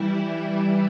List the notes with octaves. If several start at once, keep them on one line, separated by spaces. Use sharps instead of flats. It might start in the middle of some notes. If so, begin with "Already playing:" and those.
Already playing: E3 G3 E4